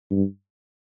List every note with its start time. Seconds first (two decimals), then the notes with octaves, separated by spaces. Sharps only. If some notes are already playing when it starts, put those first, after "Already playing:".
0.11 G2